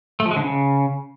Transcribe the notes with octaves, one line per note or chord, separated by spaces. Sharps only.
A3
F3
G#3
D3
C#3